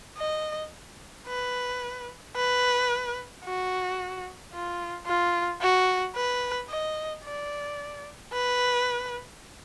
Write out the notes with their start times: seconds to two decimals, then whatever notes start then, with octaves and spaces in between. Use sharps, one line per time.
0.18 D#5
1.27 B4
2.36 B4
3.45 F#4
4.53 F4
5.06 F4
5.61 F#4
6.15 B4
6.69 D#5
7.25 D5
8.33 B4